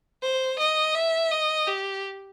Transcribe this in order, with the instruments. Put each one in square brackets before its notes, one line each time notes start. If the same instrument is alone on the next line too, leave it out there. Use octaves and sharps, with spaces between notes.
[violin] C5
D#5
E5
D#5
G4